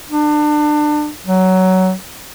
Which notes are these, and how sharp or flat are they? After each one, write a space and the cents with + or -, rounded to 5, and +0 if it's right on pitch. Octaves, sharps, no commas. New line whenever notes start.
D4 +30
F#3 +15